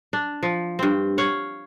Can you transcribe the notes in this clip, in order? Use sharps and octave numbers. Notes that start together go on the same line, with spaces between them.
D4
F3
G2 C4
C#5 F5 F#5